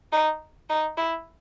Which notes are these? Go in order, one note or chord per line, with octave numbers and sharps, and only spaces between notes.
D#4
D#4
E4